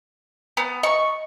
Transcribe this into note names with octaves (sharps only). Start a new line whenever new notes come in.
B3
D#5 C#6